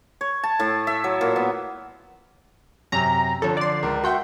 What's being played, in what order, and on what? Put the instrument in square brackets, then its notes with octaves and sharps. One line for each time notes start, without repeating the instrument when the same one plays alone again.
[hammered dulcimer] C#5
A5
A2
E5
F#3
A#2
B3
[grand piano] F#2 C3 [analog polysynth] A#5
[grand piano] D3 F3 [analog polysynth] A4 C#5
[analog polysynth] D5 C6
[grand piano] C#2 A#4
[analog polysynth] F#4 G5 [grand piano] E5 F#5 C6